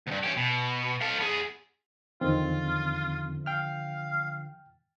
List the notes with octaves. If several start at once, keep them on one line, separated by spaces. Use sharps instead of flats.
D2 G2
C#4 G4
B2
A4 F5
B3 G#4
E2 D3 D#3 F3 C4 F4
F5 G5 F6